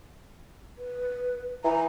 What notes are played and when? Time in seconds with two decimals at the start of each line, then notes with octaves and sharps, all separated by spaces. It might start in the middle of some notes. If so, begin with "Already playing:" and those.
0.78 B4
1.64 E3 A#5